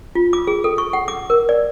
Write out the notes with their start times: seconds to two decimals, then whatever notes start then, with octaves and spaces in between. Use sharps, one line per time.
0.15 F4
0.33 D6
0.47 G#4
0.64 A4
0.78 C#6
0.93 F#5
1.08 D6
1.30 A#4
1.49 D5